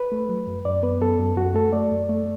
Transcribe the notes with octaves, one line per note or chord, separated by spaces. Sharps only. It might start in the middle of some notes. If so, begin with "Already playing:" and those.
Already playing: B4
A3
F#3
F#2
F#2 D5
B3 B4
F#2 A4
F#2
F#2 F#4
A3 A4
A3 D5
F#2
A3